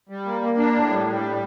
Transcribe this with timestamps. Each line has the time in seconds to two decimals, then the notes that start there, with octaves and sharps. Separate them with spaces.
0.09 G3
0.26 A#3
0.41 A#3
0.57 D4
0.74 A2
0.90 G3
1.07 G3
1.22 A2